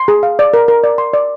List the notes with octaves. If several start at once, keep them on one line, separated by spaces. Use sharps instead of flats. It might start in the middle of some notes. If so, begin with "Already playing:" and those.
Already playing: C6
G#4
F5
D5
A#4
A#4
D5
C6
D5